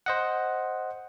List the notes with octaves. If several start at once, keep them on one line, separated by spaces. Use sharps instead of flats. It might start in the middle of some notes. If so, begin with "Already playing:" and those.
C5 D#5 F#5